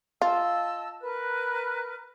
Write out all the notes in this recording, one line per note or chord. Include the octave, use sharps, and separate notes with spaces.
F4 D#5 A5 E6
A#4 B4 F#6